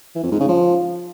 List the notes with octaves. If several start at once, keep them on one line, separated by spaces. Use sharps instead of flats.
E3
F2
G#2
C#3
F3